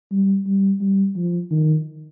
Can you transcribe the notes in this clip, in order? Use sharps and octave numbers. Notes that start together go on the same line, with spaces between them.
G3
G3
G3
F3
D#3